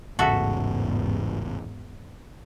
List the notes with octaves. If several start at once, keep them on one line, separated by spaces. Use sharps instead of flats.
A1 E2 G#2 C#3 F#4 A4 E5